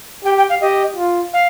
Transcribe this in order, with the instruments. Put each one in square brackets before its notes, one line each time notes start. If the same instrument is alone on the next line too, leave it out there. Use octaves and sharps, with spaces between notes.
[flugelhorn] G4 [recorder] G5
[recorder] G5
F5
[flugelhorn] G4 [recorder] D#5
[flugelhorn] F4
[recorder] F5